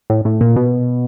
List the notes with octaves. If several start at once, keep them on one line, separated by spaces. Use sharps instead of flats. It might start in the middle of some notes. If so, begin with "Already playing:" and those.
A2
A2
A#2
B2